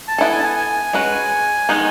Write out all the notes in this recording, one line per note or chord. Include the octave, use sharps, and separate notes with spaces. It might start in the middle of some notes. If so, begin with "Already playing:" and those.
A5
B3 E4 A4 G#5
G#5
A5
G#5
G#5
G#3 C#4 F#4 B4
D#3 G#3 B3 D#4